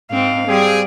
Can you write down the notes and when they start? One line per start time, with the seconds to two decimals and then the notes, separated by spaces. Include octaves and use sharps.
0.11 G#2 C4 F5
0.48 G3 C4 G#4